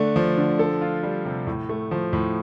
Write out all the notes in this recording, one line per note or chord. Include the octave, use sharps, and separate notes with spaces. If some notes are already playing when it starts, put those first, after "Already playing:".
Already playing: D3 A3 D4
F3
D3
A4
F4
G3
C3
A2
A3
F3
A2